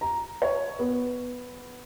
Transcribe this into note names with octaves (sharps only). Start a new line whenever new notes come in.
A#5
C#5
B3